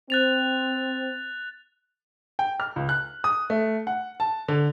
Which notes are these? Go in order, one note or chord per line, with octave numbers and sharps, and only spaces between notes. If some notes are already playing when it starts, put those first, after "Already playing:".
C4 F#6 A6 F7
G5
F6
C#2
F#6
D#6
A3
F#5
A5
D3